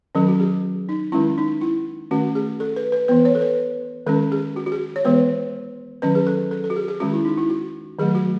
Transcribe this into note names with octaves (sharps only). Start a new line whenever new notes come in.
D#3 F#3 C#4 A4
F#4
G#4
D#4
D#3 G#3 C#4 E4
D#4
E4
D#3 A3 C#4 F#4
G#4
A4
B4
B4
E3 B3 B4
C#5
A4
B4
D#3 G#3 C#4 A4
G#4
F#4
F#4
G#4
C#5
E3 G#3 B3 B4
D#3 F#3 C#4 B4
G#4
A4
A4
A4
F#4
G#4
G#4
D#3 G#3 C#4 F#4
E4
D#4
E4
F#4
D#3 F#3 A3 G#4
G#4
F#4